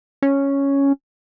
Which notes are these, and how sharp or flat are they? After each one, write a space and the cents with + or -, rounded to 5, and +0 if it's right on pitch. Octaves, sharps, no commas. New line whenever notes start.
C#4 +0